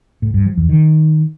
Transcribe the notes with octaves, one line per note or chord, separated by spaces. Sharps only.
A2
G2
F3
E2
D#3